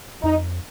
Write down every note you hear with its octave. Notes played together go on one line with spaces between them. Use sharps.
F2 D#4